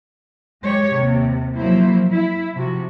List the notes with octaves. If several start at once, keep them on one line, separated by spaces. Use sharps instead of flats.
G#3 G4 C#5
D#2 C3
F3 F#3 A#3 E4 C5
E4
C3 F3 F#4